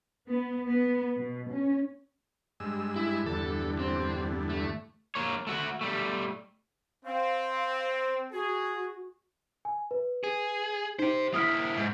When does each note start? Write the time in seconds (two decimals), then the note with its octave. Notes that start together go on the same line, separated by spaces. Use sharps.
0.26 B3
0.67 B3
1.16 B2
1.50 C#4
2.60 G2 G#3 E6
2.96 E4
3.26 E2 G2 D3 A4
3.79 C4
4.50 A3
5.15 A#3 C#5
5.47 A3 F#4
5.81 G3 A3
7.05 C4 F5
8.33 F#4 G#4
9.65 G#5
9.91 B4
10.24 G#4
10.99 D#4 G4 C5
11.34 A#3 E4 D#6 F6 B6
11.77 G#2